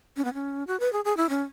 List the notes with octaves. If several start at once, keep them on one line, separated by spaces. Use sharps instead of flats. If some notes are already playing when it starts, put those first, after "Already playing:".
C#4
B3
C#4
F#4
B4
G#4
G#4
E4
C#4